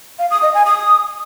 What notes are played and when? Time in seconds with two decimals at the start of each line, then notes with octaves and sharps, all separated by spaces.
0.19 F5
0.31 D#6
0.42 D#5
0.54 G#5
0.66 D#6